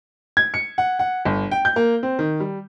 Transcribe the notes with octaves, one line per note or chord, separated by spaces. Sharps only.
G#6
C#7
F#5
F#5
G1
G5
G6
A#3
C4
D#3
G3